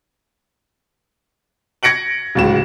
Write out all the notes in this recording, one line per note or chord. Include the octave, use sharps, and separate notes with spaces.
G#6 A#6 C#7 D7 F#7
D1 C#2 E7